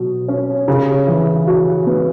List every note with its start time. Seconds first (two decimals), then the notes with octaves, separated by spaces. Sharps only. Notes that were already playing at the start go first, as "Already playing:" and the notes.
Already playing: B2 F#3
0.28 C#4
0.68 C#3
1.07 E3
1.47 F#4
1.87 B3